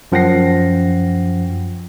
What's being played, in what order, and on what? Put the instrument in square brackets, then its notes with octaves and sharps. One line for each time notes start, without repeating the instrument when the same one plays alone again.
[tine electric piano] F#2 F3 F#5 G5 A#6 C7